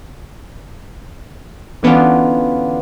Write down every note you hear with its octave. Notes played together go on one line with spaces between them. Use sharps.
D3 E3 B3 C#4 D4 F4